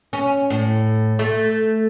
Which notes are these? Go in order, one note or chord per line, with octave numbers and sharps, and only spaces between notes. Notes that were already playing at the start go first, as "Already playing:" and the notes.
C#4
A2
A3